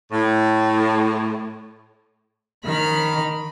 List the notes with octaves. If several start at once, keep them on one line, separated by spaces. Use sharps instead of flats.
A2
D#3 B5 F6